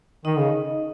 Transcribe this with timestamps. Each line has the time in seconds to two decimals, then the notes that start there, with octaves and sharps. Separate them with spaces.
0.25 D#3 D#4 D#5
0.38 C#3